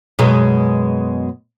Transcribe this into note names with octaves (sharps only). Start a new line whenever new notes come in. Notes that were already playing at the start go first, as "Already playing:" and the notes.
F#2 B2 G#3